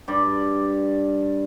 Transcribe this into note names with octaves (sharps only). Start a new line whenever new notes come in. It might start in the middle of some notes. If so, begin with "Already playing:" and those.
G2 D5